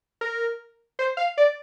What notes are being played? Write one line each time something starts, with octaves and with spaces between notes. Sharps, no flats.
A#4
C5
F5
D5